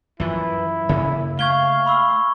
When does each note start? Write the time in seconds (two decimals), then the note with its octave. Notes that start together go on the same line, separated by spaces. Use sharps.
0.20 F#2 E3 F3 E4
0.89 F#2 C#3 A#3 C#4
1.39 A3 F5 C#6 G#6 G7
1.86 B5 C#6 E6